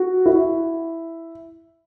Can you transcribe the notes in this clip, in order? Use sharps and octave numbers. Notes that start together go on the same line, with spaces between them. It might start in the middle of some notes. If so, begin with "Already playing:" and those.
Already playing: F#4
E4